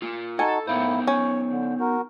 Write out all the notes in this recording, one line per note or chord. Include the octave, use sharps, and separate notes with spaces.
A#3 F4
D#4 F#4 A4 G#5 A5
A2 A#3 B3 D#4 E4 C5
C#4 C#5
D3
F#4 A#4